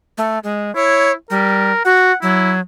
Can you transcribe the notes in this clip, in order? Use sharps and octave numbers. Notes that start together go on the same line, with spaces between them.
A3
G#3
E4 C#5
G3 A#4
F#4 F#5
F#3 E4